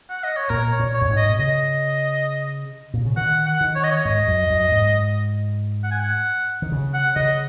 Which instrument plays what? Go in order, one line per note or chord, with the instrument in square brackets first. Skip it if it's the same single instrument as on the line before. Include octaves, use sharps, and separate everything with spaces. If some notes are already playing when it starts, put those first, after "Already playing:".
[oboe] F#5
D#5
C#5
[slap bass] A#2 [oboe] A#4
[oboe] C#5
[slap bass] A#2
[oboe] C#5
[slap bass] F#2
G#2
[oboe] D#5
[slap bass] A#2
[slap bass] C#3 [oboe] D#5
[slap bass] A#2
C#3
[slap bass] D#3 [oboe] F#5
[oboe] F#5
[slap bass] D#3
[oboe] C#5
D#5
C#5
[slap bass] G#2 [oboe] D#5
[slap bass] F#2
F#2
G#2
[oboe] F#5
G#5
F#5
[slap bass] D#3
C#3
[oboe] F#5
[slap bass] C#3 [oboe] D#5